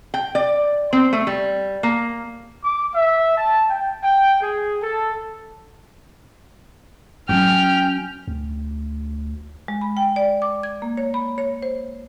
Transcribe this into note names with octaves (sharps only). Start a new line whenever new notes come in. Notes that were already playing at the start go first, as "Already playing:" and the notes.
G5
D5
C4
A3
G3
A#3
D6
E5
A5
G5
G5
G#4
A4
F#3 C#4 G5 F6
D2
G#3
B5
G5
D5
D6
G#6
A#3
C#5
B5
C#5
C5